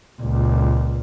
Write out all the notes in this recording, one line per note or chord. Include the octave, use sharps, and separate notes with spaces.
C#2 A#2